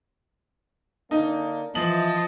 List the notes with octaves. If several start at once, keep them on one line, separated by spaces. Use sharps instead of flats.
D3 A#3 D4 D#4
E3 F3 D#5 A5 F#7